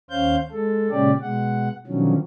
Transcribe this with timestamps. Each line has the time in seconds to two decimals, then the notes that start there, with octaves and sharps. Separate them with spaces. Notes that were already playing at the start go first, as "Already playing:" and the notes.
0.10 D#2 C#4 C5 F5 G6
0.52 G#3 A4
0.90 A#2 C#3 G#3 C#4 G4 D5
1.22 B2 G#3 F#5
1.87 B2 D3 D#3 F3 F#3 C#4